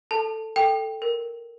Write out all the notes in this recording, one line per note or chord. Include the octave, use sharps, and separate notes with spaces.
A4 A5
A4 G5
A#4